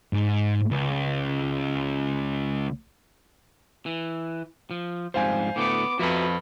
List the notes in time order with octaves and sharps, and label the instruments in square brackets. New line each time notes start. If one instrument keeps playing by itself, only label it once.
[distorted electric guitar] G#2
C#2
[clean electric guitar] E3
F3
[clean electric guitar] F2 G#2 G3 [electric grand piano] C5 F5 G#5
[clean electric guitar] A2 D3 A3 [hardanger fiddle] B3 D6
[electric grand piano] F2 F3 [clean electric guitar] F#4 E5 A#5 [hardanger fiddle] B4